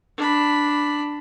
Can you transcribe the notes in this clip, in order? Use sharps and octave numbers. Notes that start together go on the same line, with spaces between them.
D4 B5